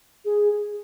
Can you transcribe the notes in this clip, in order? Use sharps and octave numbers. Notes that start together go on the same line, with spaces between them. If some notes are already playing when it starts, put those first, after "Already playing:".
G#4